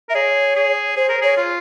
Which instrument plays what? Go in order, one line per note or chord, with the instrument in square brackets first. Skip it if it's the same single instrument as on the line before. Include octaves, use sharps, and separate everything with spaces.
[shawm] A#4 [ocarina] E5
[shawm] G#4 [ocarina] C#5
[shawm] G#4
[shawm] G#4 [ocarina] C5
[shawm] A#4
[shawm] G#4 [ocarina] C#5
[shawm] F4